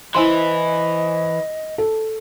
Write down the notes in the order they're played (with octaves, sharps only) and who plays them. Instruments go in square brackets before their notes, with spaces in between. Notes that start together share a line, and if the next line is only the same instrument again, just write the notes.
[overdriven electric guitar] E3 [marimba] E4 C6 [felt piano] C5 G#5 [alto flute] D#5
[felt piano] A4